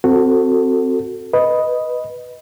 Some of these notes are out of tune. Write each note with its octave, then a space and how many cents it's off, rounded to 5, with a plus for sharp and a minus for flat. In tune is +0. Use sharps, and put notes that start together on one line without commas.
C4 +0 F#4 +0 A4 +20
B4 +0 D#5 +0